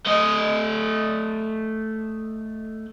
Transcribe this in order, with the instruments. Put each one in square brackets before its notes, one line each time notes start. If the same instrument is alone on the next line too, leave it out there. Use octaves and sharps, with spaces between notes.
[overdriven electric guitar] A3 D#5